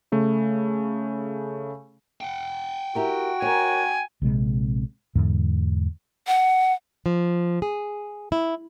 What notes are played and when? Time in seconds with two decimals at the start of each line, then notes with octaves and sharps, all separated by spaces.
0.12 C#3 A3
2.21 F#5 G5
2.95 E4 F#4 G4 A#4
3.42 A#4 C#5 G#5
4.22 A#1 C3 G#3 C4
5.15 E2 G#2 D3
6.27 F#5
7.06 F3
7.62 G#4
8.32 E4